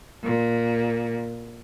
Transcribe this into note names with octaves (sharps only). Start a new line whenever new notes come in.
A#2